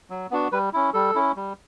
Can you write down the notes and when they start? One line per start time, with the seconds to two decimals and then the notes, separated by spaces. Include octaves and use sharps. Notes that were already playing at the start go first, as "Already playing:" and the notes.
0.10 F#3
0.31 B3 D4 F#4
0.52 G3 B4
0.73 C#4 E4
0.94 G3 A4
1.15 C#4 E4
1.36 G3